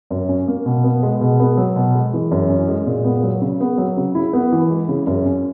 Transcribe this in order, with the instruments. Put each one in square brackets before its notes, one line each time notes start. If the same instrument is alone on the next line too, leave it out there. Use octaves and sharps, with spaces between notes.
[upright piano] F#2
C#4
A#3
B2
B3
G#3
B2
B3
F#3
B2
G#3
E3
F#2
C#4
G#3
A#2
B3
F#3
C#3
B3
F#3
C#3
E4
B3
E3
G#3
C#3
F#2
C#4